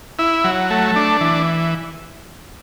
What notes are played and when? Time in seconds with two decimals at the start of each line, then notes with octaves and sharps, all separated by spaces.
0.19 E4
0.44 F#3
0.70 A3
0.96 D4
1.21 E3